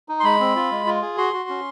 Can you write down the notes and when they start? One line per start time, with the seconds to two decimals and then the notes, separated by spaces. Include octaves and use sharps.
0.09 D#4
0.20 C6
0.24 G#3 B5
0.40 C4
0.55 F4
0.71 G#3
0.86 F4
1.02 G#4
1.17 F#4 C6
1.33 F#4
1.49 C#4